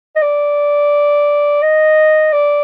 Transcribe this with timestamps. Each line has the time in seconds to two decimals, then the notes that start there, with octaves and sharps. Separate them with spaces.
0.16 D#5
0.22 D5
1.63 D#5
2.33 D5